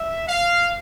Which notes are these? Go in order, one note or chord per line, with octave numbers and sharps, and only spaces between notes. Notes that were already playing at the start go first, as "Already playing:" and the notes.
Already playing: E5
F5